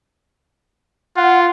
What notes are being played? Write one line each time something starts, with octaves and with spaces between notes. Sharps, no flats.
F4 F#5